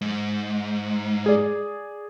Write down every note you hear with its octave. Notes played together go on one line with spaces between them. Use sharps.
G#2
G#4 D5